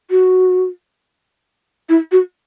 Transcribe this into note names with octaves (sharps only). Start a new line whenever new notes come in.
F#4
E4
F#4